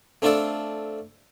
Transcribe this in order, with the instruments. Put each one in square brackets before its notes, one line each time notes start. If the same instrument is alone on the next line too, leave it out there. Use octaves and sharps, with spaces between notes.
[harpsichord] A3 C4 D4 F4 A4 D5